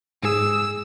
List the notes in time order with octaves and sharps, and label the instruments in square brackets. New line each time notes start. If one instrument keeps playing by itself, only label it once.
[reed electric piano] G#2 G#4 D#6 [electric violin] E6